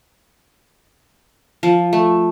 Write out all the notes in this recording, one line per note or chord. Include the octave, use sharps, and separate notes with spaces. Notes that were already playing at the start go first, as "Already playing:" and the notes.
F3
A3